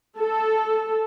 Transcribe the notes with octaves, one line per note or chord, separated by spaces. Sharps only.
A4